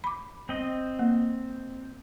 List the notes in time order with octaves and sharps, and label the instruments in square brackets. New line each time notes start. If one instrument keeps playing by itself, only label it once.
[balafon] B5 D6
[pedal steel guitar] C4 D#5
[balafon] A#3